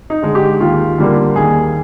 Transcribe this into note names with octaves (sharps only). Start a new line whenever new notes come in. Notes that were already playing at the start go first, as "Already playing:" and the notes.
D#4
D3 G#3
G4
D#2 F4
D3 G3 A#3
D#2 G#4